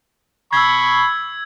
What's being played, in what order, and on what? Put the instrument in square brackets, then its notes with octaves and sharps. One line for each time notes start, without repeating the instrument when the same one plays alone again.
[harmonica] B5 C#6 [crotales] E6 G#6